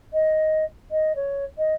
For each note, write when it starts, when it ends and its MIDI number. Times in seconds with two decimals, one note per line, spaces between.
0.13 0.65 75
0.91 1.15 75
1.15 1.45 73
1.58 1.74 75